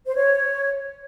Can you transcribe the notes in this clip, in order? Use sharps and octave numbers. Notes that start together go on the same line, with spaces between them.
C5
C#5